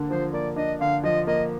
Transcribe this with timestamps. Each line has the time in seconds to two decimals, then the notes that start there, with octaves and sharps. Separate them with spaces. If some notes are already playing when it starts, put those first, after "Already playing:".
Already playing: D3 A#3 D4
0.09 F3 C5
0.33 A#3 D5
0.56 D4 D#5
0.81 D3 F5
1.04 F3 D#5
1.27 A#3 D#5